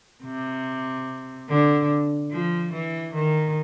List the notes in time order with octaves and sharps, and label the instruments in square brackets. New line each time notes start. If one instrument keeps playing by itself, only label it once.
[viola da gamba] C3
D3
F3
E3
D#3